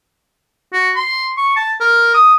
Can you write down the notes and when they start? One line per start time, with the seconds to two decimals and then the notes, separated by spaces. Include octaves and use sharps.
0.73 F#4
0.95 C6
1.37 C#6
1.56 A5
1.80 A#4
2.14 D#6